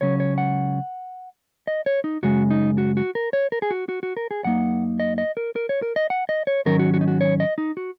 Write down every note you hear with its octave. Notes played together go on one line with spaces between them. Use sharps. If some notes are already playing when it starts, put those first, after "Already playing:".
C#2 C#3 F#3 C#4 C#5
C#5
F#5
D#5
C#5
D#4
F#2 C#3 G#3 F#4
D#4
F#4
F#4
A#4
C#5
A#4
G#4
F#4
F#4
F#4
A#4
G#4
F#2 F#3 A#3 D#4 F#5
D#5
D#5
A#4
A#4
C#5
A#4
D#5
F#5
D#5
C#5
G#2 D#3 F#3 C#4 A#4
F#4
F#4
D#4
F#4
C#5
D#5
D#4
F#4